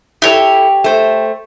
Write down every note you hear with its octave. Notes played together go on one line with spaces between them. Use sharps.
E4 G4 A4 C#5
A3 C5